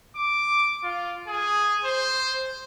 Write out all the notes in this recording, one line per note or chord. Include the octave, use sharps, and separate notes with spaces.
D6
F4
G#4
C5